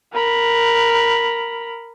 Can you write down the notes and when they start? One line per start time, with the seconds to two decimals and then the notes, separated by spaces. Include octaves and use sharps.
0.13 A#4 B5